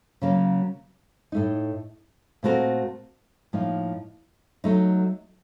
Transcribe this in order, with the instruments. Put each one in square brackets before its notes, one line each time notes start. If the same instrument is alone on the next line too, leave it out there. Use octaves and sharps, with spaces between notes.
[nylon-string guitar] C#3 F#3 A#3
A2 A3 D#4
A#2 A3 C4 F#4 A#4
A2 F3 A#3 D#4
F#3 A3 D#4